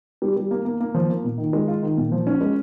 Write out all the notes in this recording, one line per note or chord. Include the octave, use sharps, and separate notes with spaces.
G3
G3
A#3
A#3
A#3
F3
A#3
A#2
D#3
G#3
F4
D#3
A#2
F3
C#4
G#3